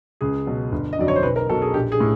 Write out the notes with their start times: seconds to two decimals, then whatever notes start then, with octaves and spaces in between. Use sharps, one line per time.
0.21 C#2 G#4
0.47 B2 F#3
0.72 G1
0.93 D#5
0.98 F2 D3 F#3 D5
1.08 C#5
1.16 C5
1.23 B1 B4
1.36 A#4
1.49 B2 F#3 A4
1.62 G#4
1.74 A#1 G4
1.92 G#4
2.00 A2